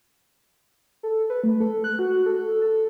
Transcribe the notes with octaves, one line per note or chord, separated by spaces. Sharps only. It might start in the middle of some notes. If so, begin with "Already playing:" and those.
A4
B4
A3
A4
F#6
F#4
A4
A4